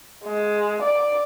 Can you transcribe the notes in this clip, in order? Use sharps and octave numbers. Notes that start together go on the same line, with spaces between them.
G#3
D5